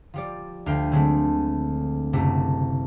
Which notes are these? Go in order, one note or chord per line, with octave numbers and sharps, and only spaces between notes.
F3 G3 D5
D2 F5 G5
D3 F#3 G#3 A3 C4
F#1 C3 G3 A3